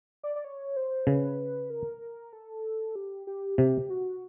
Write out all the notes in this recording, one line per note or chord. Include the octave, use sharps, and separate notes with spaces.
D5
D5
C#5
C5
C#3 B4
A#4
A4
G4
G4
C3 G4
F#4